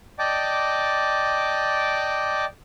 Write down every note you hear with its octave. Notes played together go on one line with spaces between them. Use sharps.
D5 D#5 G5 A5 D6